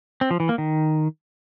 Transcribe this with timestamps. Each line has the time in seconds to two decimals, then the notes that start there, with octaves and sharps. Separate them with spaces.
0.21 C4
0.31 F3
0.40 E3
0.49 A#3
0.58 D#3